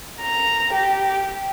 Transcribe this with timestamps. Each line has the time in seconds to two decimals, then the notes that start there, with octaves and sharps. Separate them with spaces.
0.21 A#5
0.74 G4